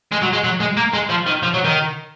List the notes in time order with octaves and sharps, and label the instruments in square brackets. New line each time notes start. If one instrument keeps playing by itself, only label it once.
[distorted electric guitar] G#3
F#3
G#3
F#3
G#3
A#3
G#3
F3
D#3
F3
F#3
D#3